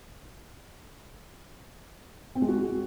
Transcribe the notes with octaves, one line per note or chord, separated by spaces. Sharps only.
C4
G#3
F#4